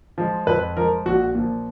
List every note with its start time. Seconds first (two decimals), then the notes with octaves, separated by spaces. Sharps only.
0.18 F3 G#3
0.47 F2 B4
0.77 F3 G#3 A#4
1.06 A#1 F#4
1.35 A#2 F3